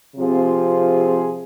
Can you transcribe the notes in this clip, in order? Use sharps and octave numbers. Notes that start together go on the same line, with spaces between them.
C3 F3 C4 F4 G#4